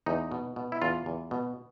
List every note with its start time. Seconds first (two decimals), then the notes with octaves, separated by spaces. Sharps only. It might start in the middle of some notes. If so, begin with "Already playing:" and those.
0.06 E2 D#4
0.32 B2
0.56 B2
0.72 E4
0.82 E2 F4
1.06 E2
1.31 B2